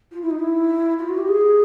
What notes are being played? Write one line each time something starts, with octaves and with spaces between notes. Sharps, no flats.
F4
E4
D#4
E4
F4
F#4
G4
G#4